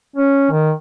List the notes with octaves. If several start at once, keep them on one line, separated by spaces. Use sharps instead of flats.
C#4
D#3